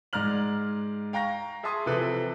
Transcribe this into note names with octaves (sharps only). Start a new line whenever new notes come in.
G#2 G#3 D5 A#5 F6 F#7
F5 G5 A#5 C#6 A#6
G#4 E5 A5 C6 D#6
C3 E3 F3 A4 B4